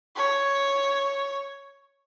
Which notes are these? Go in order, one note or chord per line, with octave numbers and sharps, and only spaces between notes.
C#5